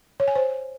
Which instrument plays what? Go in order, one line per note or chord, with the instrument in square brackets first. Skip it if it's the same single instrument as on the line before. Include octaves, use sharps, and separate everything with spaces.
[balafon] C#5
G#5
C5